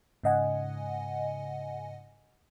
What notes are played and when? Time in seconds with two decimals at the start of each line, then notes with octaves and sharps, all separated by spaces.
0.23 G#2 C#3 D#5 F#5 G#5